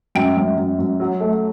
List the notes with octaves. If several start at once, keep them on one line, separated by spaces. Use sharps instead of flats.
F#2 G5
F#2
F#2
F#2
F#3
A3